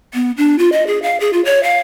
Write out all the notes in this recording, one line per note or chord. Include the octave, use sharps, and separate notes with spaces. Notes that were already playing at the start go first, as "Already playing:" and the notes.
B3
D4
F4
D#5
G#4
F5
G#4
F4
C#5
F5